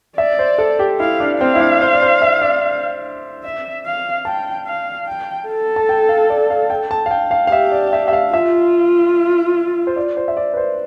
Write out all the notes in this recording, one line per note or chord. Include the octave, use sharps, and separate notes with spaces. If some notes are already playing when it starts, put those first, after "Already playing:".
D5 E5
C5
A4
G4
E4 F5
D4
C4 F5
E4
D4
C5
D5
C5
E5
D5
E5
F5
G5 A5
F5
G5
A4
A5
G5
F5
D5
F5
G5
A5
F5
G5
F5
F5
G4 E5
D5
E5
E5
F5
F4 E5
C5
D5
C5
E5
D5
B4
C5